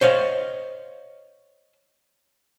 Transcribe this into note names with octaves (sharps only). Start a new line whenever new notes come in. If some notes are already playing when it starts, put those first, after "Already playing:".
C5 C#5 D#5 F5